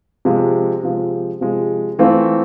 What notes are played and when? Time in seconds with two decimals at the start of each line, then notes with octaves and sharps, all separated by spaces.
0.25 C3 F3 G#3
0.83 C3 F3 G#3
1.41 C3 F3 G#3
1.99 E3 A3 C4 F4